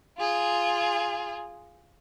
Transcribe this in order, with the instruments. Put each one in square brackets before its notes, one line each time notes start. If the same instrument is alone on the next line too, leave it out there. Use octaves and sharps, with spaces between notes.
[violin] F4 G#4